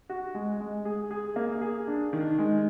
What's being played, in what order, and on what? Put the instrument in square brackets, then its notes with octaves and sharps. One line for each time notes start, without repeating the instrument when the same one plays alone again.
[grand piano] F#4
G#3
G#3
G#4
G#4
A#3
G#4
D4
D#3
G#3